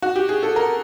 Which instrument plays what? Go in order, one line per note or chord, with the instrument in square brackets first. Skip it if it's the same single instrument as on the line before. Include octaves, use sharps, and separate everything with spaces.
[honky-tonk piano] F#4
G4
G#4
A4
A#4